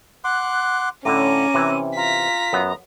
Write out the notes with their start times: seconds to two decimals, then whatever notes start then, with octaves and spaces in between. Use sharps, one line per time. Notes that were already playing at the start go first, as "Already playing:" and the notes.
0.24 F#5 C6 D6 F#6
1.05 A2 D3 C#4 A#5 D6 D#7
1.54 C3 E3
1.96 F4 A#5 B6
2.53 F#2 B3